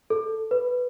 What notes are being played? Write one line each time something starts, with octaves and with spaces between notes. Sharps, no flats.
A4
B4